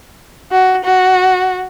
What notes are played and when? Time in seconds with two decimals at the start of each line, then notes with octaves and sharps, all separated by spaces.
0.51 F#4
0.84 F#4